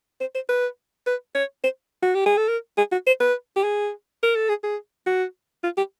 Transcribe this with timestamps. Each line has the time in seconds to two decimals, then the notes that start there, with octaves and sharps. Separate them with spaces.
0.20 C5
0.35 C5
0.49 B4
1.06 B4
1.35 C#5
1.64 C5
2.03 F#4
2.14 G4
2.26 G#4
2.37 A4
2.49 A#4
2.78 G#4
2.92 F#4
3.07 C5
3.21 B4
3.56 G4
3.64 G#4
4.23 A#4
4.36 A4
4.49 G#4
4.63 G#4
5.06 F#4
5.64 F4
5.77 G4